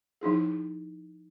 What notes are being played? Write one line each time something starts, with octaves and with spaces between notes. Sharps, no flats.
F3 D#4 E4 G#4